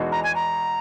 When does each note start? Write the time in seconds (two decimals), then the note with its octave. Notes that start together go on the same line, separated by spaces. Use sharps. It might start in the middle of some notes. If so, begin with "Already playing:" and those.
Already playing: E2 B2 G#3 D#4 F#4
0.12 A#5
0.23 G#5
0.35 A#5